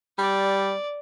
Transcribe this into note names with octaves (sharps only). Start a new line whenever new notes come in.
G3 D5